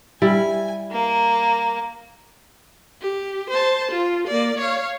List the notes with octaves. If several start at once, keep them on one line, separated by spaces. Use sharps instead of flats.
G3 E4 G#5
A#3
G4
C5 A5
F4
A#3 D5
C#5 F5